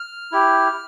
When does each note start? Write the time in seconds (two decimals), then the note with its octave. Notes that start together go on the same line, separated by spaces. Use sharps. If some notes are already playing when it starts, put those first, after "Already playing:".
Already playing: F6
0.32 E4 G4